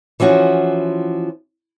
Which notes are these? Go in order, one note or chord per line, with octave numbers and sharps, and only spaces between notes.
E3 F3 C#4 F#4